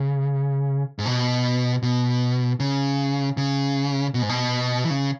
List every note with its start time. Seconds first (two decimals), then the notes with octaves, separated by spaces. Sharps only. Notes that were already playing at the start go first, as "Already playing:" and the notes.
Already playing: C#3
0.99 G#2
1.06 B2
1.82 B2
2.60 C#3
3.37 C#3
4.14 B2
4.22 G#2
4.29 B2
4.84 E3
4.90 C#3